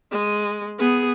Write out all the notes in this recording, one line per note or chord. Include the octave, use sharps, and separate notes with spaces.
G#3
B3 G#4